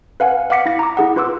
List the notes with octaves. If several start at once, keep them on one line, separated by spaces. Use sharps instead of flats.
B4 F5 F#5 G#5
F5 F#5 D6 B6 C#7
E4 A#6
A#5 D6
E4 G#4 F#5
F4 B4 C6 D6 E6